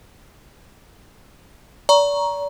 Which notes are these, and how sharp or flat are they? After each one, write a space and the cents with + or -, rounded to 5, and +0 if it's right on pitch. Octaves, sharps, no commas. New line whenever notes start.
D5 -35 A#5 +15 C#6 +0